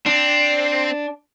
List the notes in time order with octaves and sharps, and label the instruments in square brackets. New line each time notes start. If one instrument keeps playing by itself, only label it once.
[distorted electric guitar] C4 [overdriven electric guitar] D4